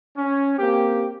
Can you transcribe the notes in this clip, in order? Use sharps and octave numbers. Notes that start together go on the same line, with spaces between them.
C#4
A#3 C4 G4